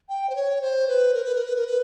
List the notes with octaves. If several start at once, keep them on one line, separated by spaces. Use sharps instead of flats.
G5
C5
C#5
C5
B4
A#4
B4
A#4
B4
A#4
B4